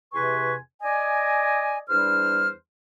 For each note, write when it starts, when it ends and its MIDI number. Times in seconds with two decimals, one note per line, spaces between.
0.13 0.55 40
0.13 0.55 48
0.13 0.55 71
0.13 0.55 80
0.13 0.55 84
0.13 0.55 85
0.83 1.80 74
0.83 1.80 75
0.83 1.80 80
1.90 2.50 40
1.90 2.50 55
1.90 2.50 62
1.90 2.50 72
1.90 2.50 89